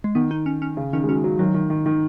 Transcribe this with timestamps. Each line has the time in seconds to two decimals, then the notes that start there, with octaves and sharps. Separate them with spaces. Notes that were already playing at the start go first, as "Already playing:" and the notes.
0.04 G#3
0.15 D#3 B3
0.31 D#4
0.46 C#4
0.62 C#4
0.77 C#3
0.93 D#3 C#4
1.03 G#3
1.09 F#3 C#4
1.24 F#3
1.39 D#3 F#3
1.54 D#3
1.70 D#3
1.86 D#3